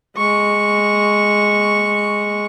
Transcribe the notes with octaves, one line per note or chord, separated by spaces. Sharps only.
G#3 C#6